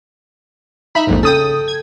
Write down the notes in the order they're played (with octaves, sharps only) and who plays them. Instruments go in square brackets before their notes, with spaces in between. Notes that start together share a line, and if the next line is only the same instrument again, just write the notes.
[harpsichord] D#4 [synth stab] E5 B5
[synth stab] A#1 F2 G#2
[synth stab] C#3 D#6 [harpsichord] A4 G5
[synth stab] G#6